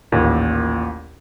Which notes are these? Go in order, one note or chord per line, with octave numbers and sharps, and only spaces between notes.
A1 D#2 A#2